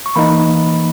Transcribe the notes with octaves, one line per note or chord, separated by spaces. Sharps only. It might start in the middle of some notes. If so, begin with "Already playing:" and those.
C#6
E3 A#3 D#4 B5